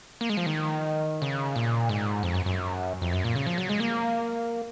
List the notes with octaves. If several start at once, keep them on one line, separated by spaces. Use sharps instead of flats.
A#3
G#3
F3
D#3
C#3
A#2
G#2
F2
F#2
F#2
F2
F#2
A#2
C#3
F3
F#3
G#3
A#3